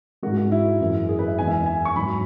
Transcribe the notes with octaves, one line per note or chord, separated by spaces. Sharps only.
G#2 G#3 F#4
F#4
E4
F#2 E3 G#3
G#4
B4
E5
E2 E3 G#3 G#5
E5
G#5
C#6
G#2 F#3 B5